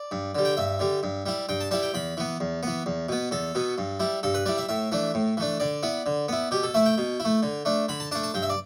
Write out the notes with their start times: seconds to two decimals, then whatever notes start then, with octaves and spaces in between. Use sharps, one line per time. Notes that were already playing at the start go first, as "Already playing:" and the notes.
Already playing: D5
0.11 G2
0.35 D3 G3
0.45 G5
0.57 G2 E5
0.79 D3 G3
1.03 G2
1.26 G3 E4
1.49 G2 G5
1.60 A5
1.71 G3 E4 A5
1.83 G5
1.94 E2 B5
2.17 E3 B3
2.40 E2
2.63 E3 B3
2.86 E2
3.09 B2 B3
3.31 E2 A4
3.55 B2 B3
3.78 G2
4.00 G3 E4
4.23 G2 A4
4.34 B4
4.46 G3 E4 D5
4.57 E5
4.69 A2 E5
4.92 E3 A3 D4
5.14 A2
5.37 E3 A3 D4
5.60 D3 D5
5.83 B3 E4
6.06 D3
6.28 B3 E4
6.51 B2 G4
6.63 A4
6.74 A3 E4 E5
6.86 G5
6.98 B2
7.20 E4
7.25 A3
7.42 D3
7.65 A3 D4
7.88 D3 B5
8.00 A5
8.11 D4 A5
8.15 A3
8.23 A5
8.34 G2 G5
8.42 E5
8.50 D5